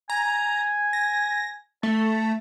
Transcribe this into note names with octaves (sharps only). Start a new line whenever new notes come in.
G#5 A#5
A#6
A3 A5